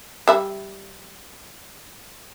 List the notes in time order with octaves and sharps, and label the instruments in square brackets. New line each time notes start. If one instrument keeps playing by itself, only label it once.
[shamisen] G3 E5 B5